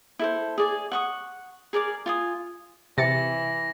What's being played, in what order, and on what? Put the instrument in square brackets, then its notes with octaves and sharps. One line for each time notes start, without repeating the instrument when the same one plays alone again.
[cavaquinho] E4 A4 C5
G#4 D5 G#5
F#5 C#6 D#6
G#4 A#4 D5 D6
F4 G#5 D#6
[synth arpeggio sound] C3 A6 C#7 [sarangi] E3 [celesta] E5 [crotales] A#6